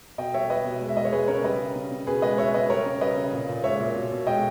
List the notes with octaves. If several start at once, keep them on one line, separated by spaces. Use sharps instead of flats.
B2 D#5 G5
G3 C#5 E5
G3 B4 D#5
B2
G#3
E5
G#3 D#5
C#5
G#3 G#4 B4
C#3 A#4 C#5
G3 B4 D#5
C#3
C#3
C#3
B2 G#4 B4
G#3 B4 D#5
G#3 C#5 E5
B2 B4 D#5
G3 A#4 C#5
C#3
G3 B4 D#5
C#3
A#2
A#2
G#3 C#5 E5
A#2
B2
B2
G#3 D#5 G5